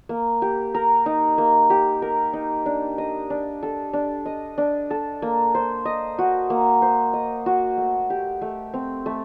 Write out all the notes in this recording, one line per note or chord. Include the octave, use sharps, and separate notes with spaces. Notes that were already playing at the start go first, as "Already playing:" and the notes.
A#3
G4
A#4
D#4
A#3
G4
A#4
D#4
D4
D#5
D4
A4
D4
D#5
D4
A4
A#3
C5
D#5
F#4
A#3
C5
D#5
F#4
A3
G4
A3
C4
A3